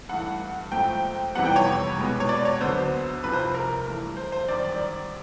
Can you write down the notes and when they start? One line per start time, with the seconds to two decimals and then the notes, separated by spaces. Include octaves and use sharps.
0.09 G2 E3 A3 F#5
0.72 G#2 F3 A3 C4 G5
1.35 F2 C3 E3 G3 B3 F#5
1.45 G5
1.56 C#5
1.98 B2 G#3 B3
2.20 C#5
2.29 D5
2.45 C#5
2.60 D2 D3 F#3 B3 C5
3.24 C2 C3 F3 B4
3.33 C5
3.39 B4
3.55 A#4
3.86 G2 E3 A3
4.17 C5
4.32 C5
4.48 F#2 D#3 G3 C4 D5
4.65 D5